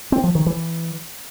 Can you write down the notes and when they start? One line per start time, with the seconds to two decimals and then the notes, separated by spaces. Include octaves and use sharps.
0.12 C4
0.24 F3
0.35 D#3
0.46 E3